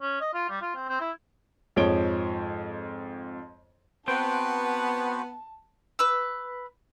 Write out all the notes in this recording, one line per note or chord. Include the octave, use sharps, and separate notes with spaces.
C#4
D#5
F4
G3
F4
C4
C4
E4
F2 G#2 F3 C#5 D7 G7
B3 C4 F#4 B4 C5 G5 A5
B4 E6